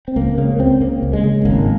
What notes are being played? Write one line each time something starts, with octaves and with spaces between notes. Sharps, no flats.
C4
C#2 A#3
C#3 A#3
C#2 C4
C#3 A#3
C#2
G#3
C#3
G#1 A#3